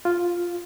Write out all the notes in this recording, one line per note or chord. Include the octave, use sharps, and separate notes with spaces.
F4